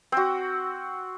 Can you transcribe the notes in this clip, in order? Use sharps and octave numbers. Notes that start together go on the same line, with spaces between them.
C4 F#4